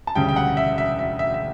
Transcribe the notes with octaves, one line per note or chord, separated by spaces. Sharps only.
A5
E1 D2 C#3 G3 G5
G5
F#5
E5
E5
E5
E5
E5